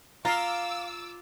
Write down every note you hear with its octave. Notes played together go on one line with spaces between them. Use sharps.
F4 F5 A#5 D6 E6